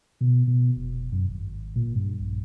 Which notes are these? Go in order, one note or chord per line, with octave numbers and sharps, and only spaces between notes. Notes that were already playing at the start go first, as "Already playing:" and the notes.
B2
B2
F1
F#2
G#1
A#2
G2
A#1